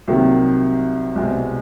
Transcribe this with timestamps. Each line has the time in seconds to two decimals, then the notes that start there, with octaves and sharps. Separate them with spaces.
0.08 C2 C3 D#3 F#3 A#3
1.15 C2 B2 G#3 C4